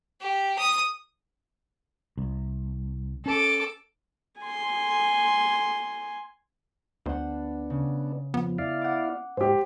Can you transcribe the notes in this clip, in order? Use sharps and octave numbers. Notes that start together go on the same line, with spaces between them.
G4
D#6
C2
C#4 A4 D6
G#5 C6
D2 B3 D4 C5 F#5
C#3
F2 F3 B3
E4 D5 F5
F#5 D6
G#2 G4 C5